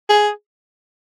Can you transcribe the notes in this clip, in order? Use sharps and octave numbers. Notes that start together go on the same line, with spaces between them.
G#4